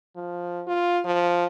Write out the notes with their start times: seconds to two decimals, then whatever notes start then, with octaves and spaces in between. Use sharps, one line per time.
0.16 F3
0.67 F4
1.05 F3